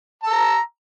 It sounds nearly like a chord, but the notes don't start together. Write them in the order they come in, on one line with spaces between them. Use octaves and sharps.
A5 E6 A#5